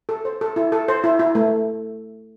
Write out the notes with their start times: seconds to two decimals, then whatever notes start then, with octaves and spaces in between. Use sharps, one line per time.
0.09 A4
0.25 C5
0.41 A4
0.56 E4
0.72 A4
0.88 C5
1.04 E4
1.19 E4
1.35 A3